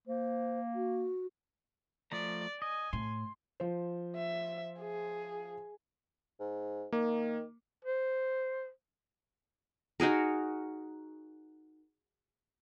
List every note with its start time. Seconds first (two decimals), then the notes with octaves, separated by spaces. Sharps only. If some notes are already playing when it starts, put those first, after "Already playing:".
0.08 A#3 C5
0.75 F#4
2.12 F3 A3 D5 A#5
2.62 D#5 G#5
2.93 A2 C6
3.60 F3 C5
4.16 E5
4.80 G#4
6.40 G#2
6.92 D#3 A#3
7.85 C5
10.00 D#4 F#4 G#4 A#4